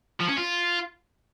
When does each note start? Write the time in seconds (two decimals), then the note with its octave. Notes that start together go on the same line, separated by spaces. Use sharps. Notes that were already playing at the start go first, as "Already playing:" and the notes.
0.20 F3
0.29 C#4
0.38 F4